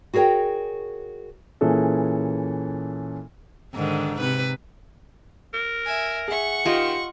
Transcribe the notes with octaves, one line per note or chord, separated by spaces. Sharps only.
F#4 G#4 A#4 C#5 G5
A#2 E3 C#4 G#4 A4
G#2 D3 D#3
C3 B4
A#4
E5 G#5
G#4 E5 F#5 C#6
D#3 F4 G4 D#5